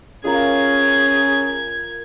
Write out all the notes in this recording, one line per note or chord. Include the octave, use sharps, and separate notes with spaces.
C#4 F4 G#4 A#4 G#6